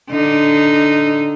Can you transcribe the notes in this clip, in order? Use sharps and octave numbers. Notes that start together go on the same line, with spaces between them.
D3 D#4